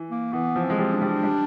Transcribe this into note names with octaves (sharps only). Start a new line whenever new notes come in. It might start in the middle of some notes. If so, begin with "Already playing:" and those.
Already playing: E3
A#3
E3 B3
F3
C4
G#3
G3
D4
G3
G3